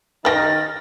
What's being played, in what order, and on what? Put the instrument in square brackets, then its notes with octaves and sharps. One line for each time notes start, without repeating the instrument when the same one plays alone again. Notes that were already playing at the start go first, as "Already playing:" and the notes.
[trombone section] D#3 D#4 [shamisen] B4 G5 [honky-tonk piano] F6 A#6 [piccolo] A6